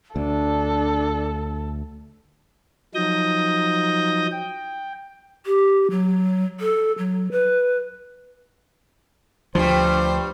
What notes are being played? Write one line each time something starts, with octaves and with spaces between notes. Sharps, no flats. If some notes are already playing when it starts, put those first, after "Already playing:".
D2 D4 A4
F3 F#3 D#4 D#6 G6 A#6
G5
G4
F#3
A4
F#3
B4
D2 G2 F3 G3 C5